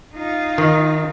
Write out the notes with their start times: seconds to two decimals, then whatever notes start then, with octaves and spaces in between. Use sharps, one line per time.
0.14 D#4 F4
0.58 D#3